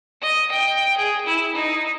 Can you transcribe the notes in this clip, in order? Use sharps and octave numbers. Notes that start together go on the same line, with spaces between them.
D#5
G5
G#4
E4
D#4